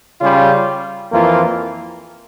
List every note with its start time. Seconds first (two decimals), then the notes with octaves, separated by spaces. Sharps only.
0.20 C#3 G3 C#4 F4
1.11 F2 E3 A#3 F4